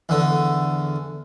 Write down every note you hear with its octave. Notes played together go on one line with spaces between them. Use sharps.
E2 D3